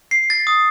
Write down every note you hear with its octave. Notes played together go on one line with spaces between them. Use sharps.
C7
A6
D#6